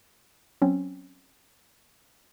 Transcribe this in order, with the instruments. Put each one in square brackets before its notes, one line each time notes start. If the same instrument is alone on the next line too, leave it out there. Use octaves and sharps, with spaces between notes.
[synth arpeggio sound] F#3 C4 C#4